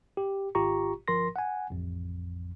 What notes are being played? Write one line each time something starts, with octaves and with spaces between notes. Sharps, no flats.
G4
G#1 F4 G4 A#5 C#6
G1 F3 A#4 C6 A#6
F#5 G#5
A1 F2